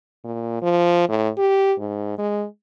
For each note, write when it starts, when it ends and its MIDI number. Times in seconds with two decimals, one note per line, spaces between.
0.24 0.58 46
0.62 1.05 53
1.09 1.29 45
1.38 1.74 67
1.79 2.13 44
2.18 2.45 56